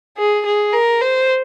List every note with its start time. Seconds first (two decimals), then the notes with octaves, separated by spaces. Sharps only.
0.18 G#4
0.46 G#4
0.73 A#4
1.01 C5